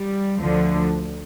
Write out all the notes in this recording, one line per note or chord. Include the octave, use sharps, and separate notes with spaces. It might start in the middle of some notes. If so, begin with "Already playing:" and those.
Already playing: G3
D2 D3 F3